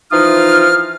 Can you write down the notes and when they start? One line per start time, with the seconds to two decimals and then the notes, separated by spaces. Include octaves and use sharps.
0.12 E3 F3 D#4 F4 D#6 F6